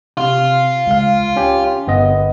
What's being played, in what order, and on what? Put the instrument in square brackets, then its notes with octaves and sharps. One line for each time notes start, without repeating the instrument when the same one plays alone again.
[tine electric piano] C3 [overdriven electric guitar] F4
[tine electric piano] C#2 F5
C#4 G4
G1 B3 D#5